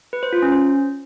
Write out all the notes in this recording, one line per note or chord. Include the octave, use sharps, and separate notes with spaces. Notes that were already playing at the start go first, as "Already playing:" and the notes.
B4
C5
F4
C#4
C5